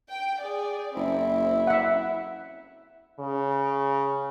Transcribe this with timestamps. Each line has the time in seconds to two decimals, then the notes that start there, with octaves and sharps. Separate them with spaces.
0.11 G5
0.41 G#4 D5
0.95 F#1 C4 E4
1.67 E5 F#5
3.20 C#3